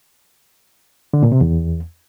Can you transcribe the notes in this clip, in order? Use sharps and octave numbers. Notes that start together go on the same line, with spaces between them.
D3
A#2
C3
E2